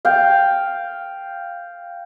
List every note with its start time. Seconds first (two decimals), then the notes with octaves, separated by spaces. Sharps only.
0.05 F5 G5